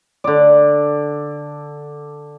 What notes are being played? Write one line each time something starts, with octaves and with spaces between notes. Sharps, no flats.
D3 D5